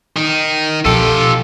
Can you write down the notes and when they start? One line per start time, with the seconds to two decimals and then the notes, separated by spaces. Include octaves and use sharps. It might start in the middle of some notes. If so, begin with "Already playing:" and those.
0.17 D#3 D#4
0.85 B2 F3 F4 G4 A4